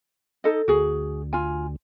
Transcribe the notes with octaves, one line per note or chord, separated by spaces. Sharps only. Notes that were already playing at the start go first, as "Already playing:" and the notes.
D#4 A4 D#5
D2 F#4 G#4
F4 G#5